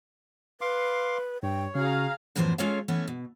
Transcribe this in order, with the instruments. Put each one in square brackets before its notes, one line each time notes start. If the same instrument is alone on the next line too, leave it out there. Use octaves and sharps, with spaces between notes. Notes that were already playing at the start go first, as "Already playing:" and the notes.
[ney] B4 [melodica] F5 C6 D6
[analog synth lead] G2 [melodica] C#5 [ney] G5
[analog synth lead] C#3 [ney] F#4 [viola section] G#4 F5 A#5
[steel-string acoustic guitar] F#2 A2 E3 F3 B3 C5
G#3 C#4 F4 A4 C#5 F5
E3 A3 B3 C#4
B2